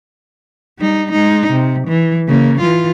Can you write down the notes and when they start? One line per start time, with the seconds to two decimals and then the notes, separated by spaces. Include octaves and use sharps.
0.79 G3 D#4
1.12 G#3 D#4
1.51 C3
1.87 E3
2.28 C#3 A#3
2.61 E3 F4